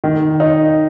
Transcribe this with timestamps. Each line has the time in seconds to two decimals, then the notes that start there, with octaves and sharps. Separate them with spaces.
0.04 D#3
0.40 D#4